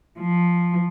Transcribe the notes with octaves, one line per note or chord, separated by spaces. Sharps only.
F3